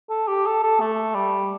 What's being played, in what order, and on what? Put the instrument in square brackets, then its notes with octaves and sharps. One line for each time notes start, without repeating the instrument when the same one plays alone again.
[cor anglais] A4
G4
A4
A4
A3
G3